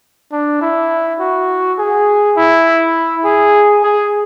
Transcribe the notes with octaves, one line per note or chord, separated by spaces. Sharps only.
D4
E4
F#4
G#4
E4
G#4
G#4